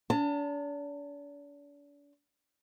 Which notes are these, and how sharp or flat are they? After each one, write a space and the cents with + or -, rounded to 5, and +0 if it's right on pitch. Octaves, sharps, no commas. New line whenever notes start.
D4 -40 A5 +40